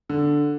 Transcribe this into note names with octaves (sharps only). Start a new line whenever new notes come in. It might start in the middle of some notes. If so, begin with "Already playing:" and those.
D3